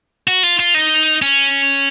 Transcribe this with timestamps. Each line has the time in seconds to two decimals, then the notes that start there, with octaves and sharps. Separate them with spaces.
0.27 F#4
0.43 F4
0.59 F4
0.74 D#4
1.22 C#4